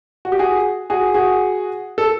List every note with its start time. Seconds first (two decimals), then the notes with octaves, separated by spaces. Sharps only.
0.25 F#4
0.32 G4
0.39 F#4 G#4
0.90 F#4 G#4
1.14 F#4 G#4
1.98 A4